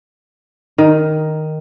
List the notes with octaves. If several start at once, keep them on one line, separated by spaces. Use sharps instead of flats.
D#3